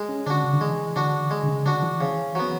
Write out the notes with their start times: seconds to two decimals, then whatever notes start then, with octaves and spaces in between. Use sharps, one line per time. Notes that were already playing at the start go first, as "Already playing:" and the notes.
Already playing: G#3
0.09 C#4
0.27 D3 D4 F#4
0.44 C#3
0.53 D3
0.61 E3 G#3
0.96 D3 D4 F#4
1.31 G#3
1.43 D3
1.48 C#3
1.66 D3 D4 F#4
1.83 E3
2.01 C#3
2.35 F#3 B3